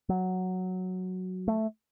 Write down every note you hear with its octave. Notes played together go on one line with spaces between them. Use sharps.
F#3
A3